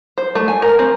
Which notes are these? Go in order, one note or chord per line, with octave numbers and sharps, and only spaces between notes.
C5
A3
G#5
A#4
C4